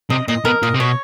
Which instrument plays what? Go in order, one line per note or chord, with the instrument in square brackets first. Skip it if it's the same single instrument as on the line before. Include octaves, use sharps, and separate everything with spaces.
[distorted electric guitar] C3 [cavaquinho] D#5
[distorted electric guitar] A#2 [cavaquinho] D#5
[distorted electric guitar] B2 [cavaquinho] A#4
[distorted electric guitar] A#2 [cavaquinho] D#5
[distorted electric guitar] C3
[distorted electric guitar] B2 [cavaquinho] C#5